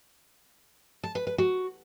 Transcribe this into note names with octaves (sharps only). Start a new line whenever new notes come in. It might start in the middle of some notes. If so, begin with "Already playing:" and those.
A5
B4
B4
F#4